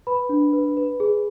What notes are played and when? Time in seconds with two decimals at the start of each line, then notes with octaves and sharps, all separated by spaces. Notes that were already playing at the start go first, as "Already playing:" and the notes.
0.07 B4 B5
0.29 D4
0.53 B4
0.77 B4
1.00 G#4